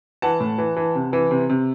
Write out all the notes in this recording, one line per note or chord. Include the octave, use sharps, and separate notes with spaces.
E3 F#5 A5
A2
E3
E3
C3
E3
C3
C3